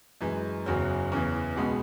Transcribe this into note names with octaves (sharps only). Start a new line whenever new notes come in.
F#2 E3 G#3
F#1 E2 C#3 F#3
E2 C#3 E3
C#2 B2 G#3 B3